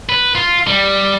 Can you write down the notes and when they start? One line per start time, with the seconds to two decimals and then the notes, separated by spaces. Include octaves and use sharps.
0.09 B4
0.35 F4
0.67 G3